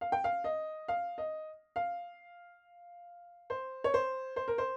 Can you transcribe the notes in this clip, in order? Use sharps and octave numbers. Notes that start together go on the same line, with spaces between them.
F5
G5
F5
D#5
F5
D#5
F5
C5
C#5
C5
C5
A#4
C5